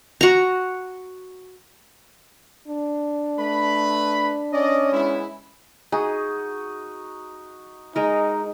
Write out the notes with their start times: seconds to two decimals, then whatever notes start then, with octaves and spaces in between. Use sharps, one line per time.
0.21 F#4 A#5
2.68 D4
3.40 A3 B4 B5
4.53 C#4 D5 D#5
4.93 G#3 B3 E4
5.92 D#4 F#4 G#4
7.96 G#3 D#4 A#4